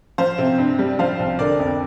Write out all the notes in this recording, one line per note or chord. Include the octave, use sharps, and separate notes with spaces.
F3 C5 F5
C3
G2
G3
F3 C5 F5
C2
D3 A#4 D5
F2